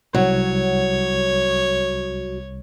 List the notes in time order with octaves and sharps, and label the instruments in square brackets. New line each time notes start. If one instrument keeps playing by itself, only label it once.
[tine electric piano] C2 [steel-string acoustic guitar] F#3 [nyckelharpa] C#5